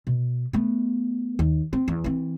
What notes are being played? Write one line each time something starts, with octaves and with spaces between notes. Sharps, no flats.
B2
A3 B3
D#2
C4
E2
E3 C4